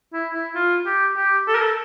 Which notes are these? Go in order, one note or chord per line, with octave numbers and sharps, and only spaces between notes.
E4
E4
F4
G4
G4
A4
A#4
A4